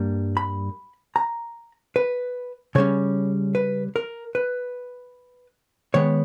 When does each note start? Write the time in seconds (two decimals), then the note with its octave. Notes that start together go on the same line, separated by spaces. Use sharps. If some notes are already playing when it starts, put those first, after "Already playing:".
Already playing: G2 G3 A#3
0.37 B5
1.16 A#5
1.96 B4
2.75 C#3 G3 C#4 C#5
3.55 B4
3.96 A#4
4.35 B4
5.94 D#3 G#3 B3 C#5